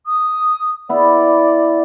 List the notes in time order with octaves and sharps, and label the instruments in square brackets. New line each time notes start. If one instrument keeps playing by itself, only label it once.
[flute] D#6
[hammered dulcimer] B3 E4 [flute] D5